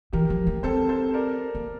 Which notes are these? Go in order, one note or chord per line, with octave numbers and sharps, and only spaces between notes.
E3 G4 A#4
F3
A3
C4 A4 C5
A4 C5
A#4 D5
A#3